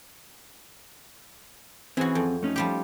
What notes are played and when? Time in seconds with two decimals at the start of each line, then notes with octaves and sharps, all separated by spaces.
1.97 E3 C4 C#4 F#4 G#4
2.15 F2
2.43 A3 C#4 D#4
2.56 F3 G3 G4